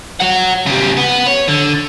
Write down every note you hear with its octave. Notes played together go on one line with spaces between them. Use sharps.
C#5 F#5
C#3 G4
B3
C#5
D3